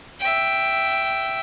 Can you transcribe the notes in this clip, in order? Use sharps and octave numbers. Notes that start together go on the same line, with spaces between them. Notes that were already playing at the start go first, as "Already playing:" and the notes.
E5 G5